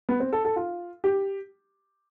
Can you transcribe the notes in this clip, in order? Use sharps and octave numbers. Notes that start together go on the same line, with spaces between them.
B3
C4
A4
A4
F4
G4